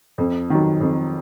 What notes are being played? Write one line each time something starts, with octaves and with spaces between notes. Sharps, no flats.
F2
D#3 F#3
F2